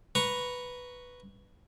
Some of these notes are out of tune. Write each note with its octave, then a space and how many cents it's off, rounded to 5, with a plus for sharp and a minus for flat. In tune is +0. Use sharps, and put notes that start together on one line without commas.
B4 +0 A#5 +0 C#6 +0